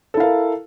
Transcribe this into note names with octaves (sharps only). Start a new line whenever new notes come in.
E4 A4 A#4 F5